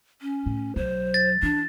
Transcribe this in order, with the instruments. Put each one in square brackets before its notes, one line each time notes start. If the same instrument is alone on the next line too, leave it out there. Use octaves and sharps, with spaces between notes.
[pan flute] C#4
[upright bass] A2
[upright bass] B1 F#3 [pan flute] C5
[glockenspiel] A6
[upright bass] E3 [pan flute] D4